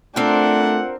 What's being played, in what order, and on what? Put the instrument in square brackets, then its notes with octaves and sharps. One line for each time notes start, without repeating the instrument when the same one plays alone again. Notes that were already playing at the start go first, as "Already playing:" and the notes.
[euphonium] A3 [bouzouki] C4 A#4 [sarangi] D4 [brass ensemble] F4 F#5